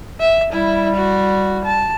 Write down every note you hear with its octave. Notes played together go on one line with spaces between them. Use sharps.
E5
G3 E4
F#4
A5